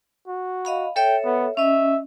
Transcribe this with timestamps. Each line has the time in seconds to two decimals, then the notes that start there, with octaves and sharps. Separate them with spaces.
0.27 F#4
0.65 D#5 F5 B5
0.96 A4 C#5 E5 G5
1.25 B3
1.57 C#4 D#5 E5